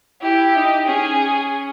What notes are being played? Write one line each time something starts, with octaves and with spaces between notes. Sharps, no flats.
E4 G4
D#4
C#4 G#4